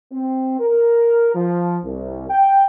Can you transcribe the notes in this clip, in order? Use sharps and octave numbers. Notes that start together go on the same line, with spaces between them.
C4
A#4
F3
C2
G5